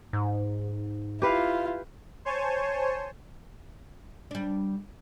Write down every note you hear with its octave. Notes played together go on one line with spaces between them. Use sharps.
G#2
E4 F4 G4 B4 F5
C5 C#5 G#5 A5
G3 D4